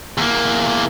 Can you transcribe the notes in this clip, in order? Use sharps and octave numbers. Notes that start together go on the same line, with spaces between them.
E2 A#3